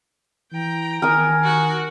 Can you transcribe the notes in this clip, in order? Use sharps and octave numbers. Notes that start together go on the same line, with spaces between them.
E3 G5 A#5
D#3 A#4 G#5 D#6
F#4